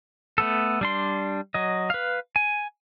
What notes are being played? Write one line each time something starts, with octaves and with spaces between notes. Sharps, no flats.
A3 B3 A4
G3 D4 C6
F#3 D#5
B4 F5
G#5